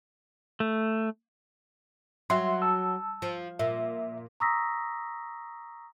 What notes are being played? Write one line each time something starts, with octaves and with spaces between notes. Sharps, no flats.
A3
F#3 F#4 E5 C6
A5 E6
F3
A#2 E5
A#5 C#6 D#6 E6 A#6 B6